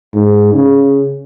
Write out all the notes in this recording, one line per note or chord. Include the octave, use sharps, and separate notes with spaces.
G#2
C#3